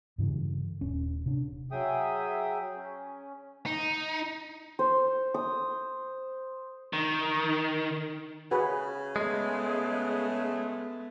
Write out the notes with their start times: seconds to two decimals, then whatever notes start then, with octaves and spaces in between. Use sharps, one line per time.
0.18 G2 C#3 E3
0.81 D#1 C#4
1.26 C3 D4
1.72 F#3 G#4 E5 G5 D#6
2.76 C#4
3.66 D#4
4.79 C5
5.34 D#6
6.93 D#3
8.51 C#3 F#4 G#4 B4
9.16 G#3 A3 B3